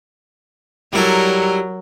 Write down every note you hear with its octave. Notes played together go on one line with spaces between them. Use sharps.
F#3 G3 E4 A4 A#4